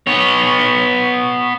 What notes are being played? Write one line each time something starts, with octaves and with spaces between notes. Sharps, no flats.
B3 C#5